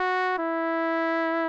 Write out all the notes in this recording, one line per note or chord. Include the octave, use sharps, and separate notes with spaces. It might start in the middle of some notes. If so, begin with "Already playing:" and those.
Already playing: F#4
E4